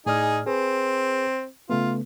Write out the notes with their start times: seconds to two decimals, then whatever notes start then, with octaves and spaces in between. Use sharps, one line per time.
0.06 A2 D#4 G#4 D5 F6
0.46 C4 G#4 B4
1.70 C#3 A3 B3 F4